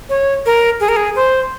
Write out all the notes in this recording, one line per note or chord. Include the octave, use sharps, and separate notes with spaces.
C#5
A#4
G#4
A#4
G#4
C5